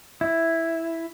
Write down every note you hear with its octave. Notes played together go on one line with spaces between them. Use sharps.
E4